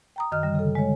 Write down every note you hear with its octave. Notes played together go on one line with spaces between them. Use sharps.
G5 A#5 D#6
F#2 D#3 D#5 F6
D3 G3
C#3 A4
G#3 C#5